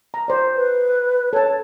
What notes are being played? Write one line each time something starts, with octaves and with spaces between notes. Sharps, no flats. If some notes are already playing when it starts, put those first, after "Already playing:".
A#5
C5 D5
B4
A4 C#5 A5